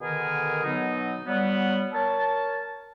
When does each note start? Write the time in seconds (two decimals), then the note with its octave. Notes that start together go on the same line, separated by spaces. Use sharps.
0.01 B2 D3 D#3 G#4 A#4
0.65 B2 F#3 B3 D#4
1.26 F#3 G3 B3
1.93 A#4 C#5 A5